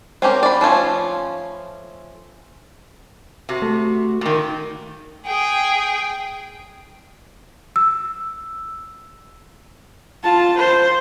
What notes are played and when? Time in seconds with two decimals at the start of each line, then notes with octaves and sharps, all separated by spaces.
0.22 C4 C#4 G4 A#4
0.43 D5 B5
0.61 F3 A3 C#4 F4
3.49 C3 F#4
3.62 A3
4.21 A#2 D#3
5.26 G#4 G5
7.76 E6
10.23 F4 A5
10.56 C5